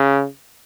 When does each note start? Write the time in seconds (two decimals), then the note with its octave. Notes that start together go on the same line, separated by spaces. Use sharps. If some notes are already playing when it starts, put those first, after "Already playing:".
Already playing: C#3